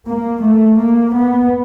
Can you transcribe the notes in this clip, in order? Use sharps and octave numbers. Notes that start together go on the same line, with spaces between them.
A#3
A3
A#3
B3